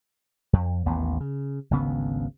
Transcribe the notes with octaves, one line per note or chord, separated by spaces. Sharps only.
F2
A1 D#2 B3
C#3
G#1 D2 C#3 B3